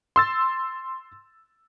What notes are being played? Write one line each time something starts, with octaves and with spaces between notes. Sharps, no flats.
C6 E6 A6